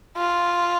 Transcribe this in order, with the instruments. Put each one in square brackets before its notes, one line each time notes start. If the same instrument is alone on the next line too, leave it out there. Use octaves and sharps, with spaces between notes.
[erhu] F4